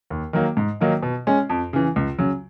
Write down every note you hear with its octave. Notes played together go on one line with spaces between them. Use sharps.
D#2
D#3 F#3 A#3
G#2
D#3 F#3 A#3 D#4
B2
G#3 C#4
F2
C#3 E3
C#2
C#3 F#3